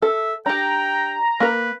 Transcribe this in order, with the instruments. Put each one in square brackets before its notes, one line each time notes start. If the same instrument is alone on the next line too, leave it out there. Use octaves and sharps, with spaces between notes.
[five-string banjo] A4 [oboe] E5
[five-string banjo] D4 G4 [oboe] G5 [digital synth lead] A#5
[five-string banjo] A#3 A#4 [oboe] B4